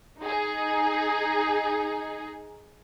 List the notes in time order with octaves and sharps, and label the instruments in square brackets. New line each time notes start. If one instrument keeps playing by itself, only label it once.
[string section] D#4 G#4